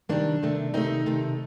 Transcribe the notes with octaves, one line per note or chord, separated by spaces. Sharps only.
C3 D#3 G3 A#3 D4
C3 D#3 A3
C3 D#3 A3 C4 D#4
C3 D#3 A3